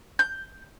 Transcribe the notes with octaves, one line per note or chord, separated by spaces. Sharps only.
G6